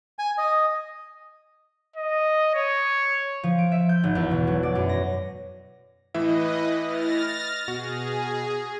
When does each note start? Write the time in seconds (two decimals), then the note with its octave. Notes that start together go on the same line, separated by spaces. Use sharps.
0.19 G#5
0.38 D#5
1.96 D#5
2.54 C#5
3.43 F3
3.59 D7
3.72 E5
3.89 G6
4.04 G#1
4.15 E2
4.31 B2
4.47 F#3
4.63 D5
4.75 F#2
4.89 A#6
6.14 A2 E3 E4 B4 D#5 E5
6.84 F6 A6 A#6
7.68 B2 F#4 G#4